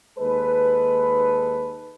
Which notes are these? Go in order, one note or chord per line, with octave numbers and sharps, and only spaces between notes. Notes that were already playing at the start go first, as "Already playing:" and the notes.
D#2 G#3 A4 B4